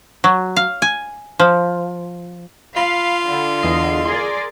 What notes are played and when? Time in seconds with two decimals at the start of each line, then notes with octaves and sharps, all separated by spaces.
0.24 F#3
0.56 F5
0.82 G#5
1.39 F3
2.77 F4 F5 B5
3.27 D3
3.63 E2 D#5 C7
4.05 G#4 A#4 D5 C6